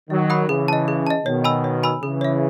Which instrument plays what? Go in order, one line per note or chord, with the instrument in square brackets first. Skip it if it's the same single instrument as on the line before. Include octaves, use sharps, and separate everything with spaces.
[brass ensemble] D#3 F#3 [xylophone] D#5
[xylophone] F#5 B5 D#6 F#6
[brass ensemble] C#3 E3 [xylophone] G#4
[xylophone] D#5 A5
G#4
D#5 A5
[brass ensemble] B2 D#3 [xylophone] C#5
[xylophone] G#5 B5 E6
C#5
G#5 B5 E6
[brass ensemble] C#3 E3 [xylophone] G#4
[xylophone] C#5 E5